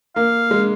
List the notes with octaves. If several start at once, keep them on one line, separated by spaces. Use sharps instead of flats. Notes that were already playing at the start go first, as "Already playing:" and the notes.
A#3 F5
G#3